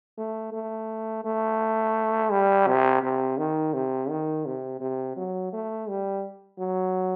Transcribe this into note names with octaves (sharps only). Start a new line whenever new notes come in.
A3
A3
A3
G3
C3
C3
D#3
C3
D#3
C3
C3
F#3
A3
G3
F#3